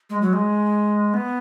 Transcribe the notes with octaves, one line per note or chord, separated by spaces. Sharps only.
G#3
F#3
G#3
B3